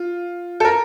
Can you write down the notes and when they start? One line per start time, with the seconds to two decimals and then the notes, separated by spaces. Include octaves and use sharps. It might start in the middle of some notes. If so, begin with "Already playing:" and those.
Already playing: F4
0.60 A4
0.65 A#4